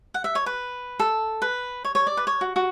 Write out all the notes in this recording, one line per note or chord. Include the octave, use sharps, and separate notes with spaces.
F#5
E5
C#5
B4
A4
B4
C#5
C#5
D5
B4
C#5
F#4
F#4